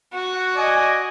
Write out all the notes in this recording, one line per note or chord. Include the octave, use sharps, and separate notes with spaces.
F#4
D5 D#5 G#5